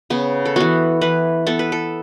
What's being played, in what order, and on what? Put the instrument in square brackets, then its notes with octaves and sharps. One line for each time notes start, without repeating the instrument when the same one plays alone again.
[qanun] C#3 B3
A4
E3 B3 F#4
E3 B4
B3 A4
B4
A4